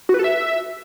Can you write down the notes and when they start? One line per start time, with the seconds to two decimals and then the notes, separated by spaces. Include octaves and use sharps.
0.09 F#4
0.14 B4
0.19 A4
0.24 E5